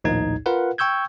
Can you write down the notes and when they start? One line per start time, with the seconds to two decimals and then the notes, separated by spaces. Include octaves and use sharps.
0.04 A#1 D#2 A2 D#4 G#6
0.46 F4 A#4 B4 F5 F#5
0.78 G5 C#6 E6 G6 G#6